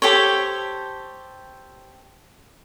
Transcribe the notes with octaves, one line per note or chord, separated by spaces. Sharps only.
G4 A4 C5 C#5